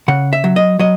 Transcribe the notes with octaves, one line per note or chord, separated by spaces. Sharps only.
C#3 F#5
E5
F#3
D#5
F#3 D#5